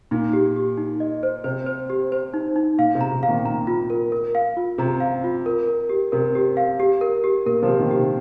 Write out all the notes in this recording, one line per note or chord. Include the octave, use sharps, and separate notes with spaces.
A#2 D#4
G4
G4
D#4
D#5
C5
C3 C5
C5
G4
C5
D#4
D#4
A#2 F5
C3
A#5
C3
F5
A#2 D#3
A#2 A#5
F4
A#4
A#4
F5
F4
C3 A#5
F5
F4
A#4
A#4
G4
C3 A#4
G4
F5
G4
A#4
G4
A#2 A#4
C3 F3
G4
A#2 D#3
G4
C3